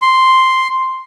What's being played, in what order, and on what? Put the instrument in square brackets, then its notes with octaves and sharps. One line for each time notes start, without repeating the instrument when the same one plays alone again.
[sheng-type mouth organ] C6